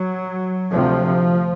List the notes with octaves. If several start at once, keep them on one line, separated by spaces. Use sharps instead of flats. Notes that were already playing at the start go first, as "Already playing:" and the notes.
Already playing: F#3
D2 C3 F3